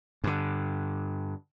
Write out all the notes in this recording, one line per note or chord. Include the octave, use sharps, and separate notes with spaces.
G2 D3